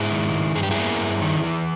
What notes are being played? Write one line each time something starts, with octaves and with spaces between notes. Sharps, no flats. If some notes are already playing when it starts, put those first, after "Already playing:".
Already playing: G#2 E4 G#4
D#3
G#2
G2 G#4
G4
E4 G#4
A#3
G2
D#3
E3